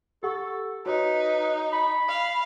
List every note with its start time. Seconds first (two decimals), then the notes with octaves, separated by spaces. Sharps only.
0.23 G4 A4 F#5 C#6
0.86 D#4 F#4 B4 C#5
1.73 B5
2.08 F5